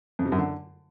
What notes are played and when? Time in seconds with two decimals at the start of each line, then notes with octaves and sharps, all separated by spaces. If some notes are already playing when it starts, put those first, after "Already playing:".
0.19 F2
0.25 C3
0.32 F#2
0.38 D3